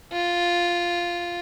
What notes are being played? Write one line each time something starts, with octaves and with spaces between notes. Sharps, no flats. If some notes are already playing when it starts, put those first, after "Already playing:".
F4